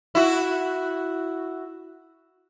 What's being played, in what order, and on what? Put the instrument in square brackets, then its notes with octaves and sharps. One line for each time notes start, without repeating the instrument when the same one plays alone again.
[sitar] E4 F#4